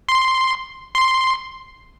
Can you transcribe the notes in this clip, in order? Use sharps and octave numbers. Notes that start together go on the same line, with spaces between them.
C6
C6